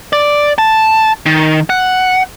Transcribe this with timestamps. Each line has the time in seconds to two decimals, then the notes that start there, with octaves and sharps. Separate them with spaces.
0.13 D5
0.58 A5
1.26 D#3
1.70 F#5